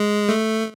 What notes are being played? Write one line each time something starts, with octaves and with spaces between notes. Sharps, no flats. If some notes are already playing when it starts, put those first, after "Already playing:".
Already playing: G#3
A3